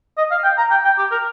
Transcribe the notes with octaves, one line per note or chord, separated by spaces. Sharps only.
D#5
F5
G5
A#5
G5
G5
G4
A#4